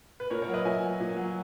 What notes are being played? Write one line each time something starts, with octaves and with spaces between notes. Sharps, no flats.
B4
A#2 A#4 C#5
A#4 C#5
F#3
B4 D#5
A#2 E5 G#5
F#3
A#2
F#3